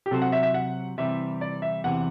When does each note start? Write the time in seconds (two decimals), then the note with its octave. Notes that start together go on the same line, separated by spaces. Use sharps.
0.06 G4
0.11 C3 F#3 C4 F#4 A4 C5
0.22 F#5
0.32 E5
0.43 E5
0.54 F#5
0.98 C3 E3 G3 E5
1.41 D5
1.62 E5
1.84 E2 C3 E3 F#5